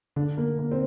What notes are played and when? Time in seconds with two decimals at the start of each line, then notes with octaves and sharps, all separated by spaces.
0.16 D3 D4
0.37 A#3
0.59 A#3
0.72 C4